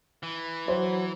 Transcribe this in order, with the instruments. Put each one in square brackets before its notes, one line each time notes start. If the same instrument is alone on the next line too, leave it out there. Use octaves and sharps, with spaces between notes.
[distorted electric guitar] E3
[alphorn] F#3 [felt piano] C5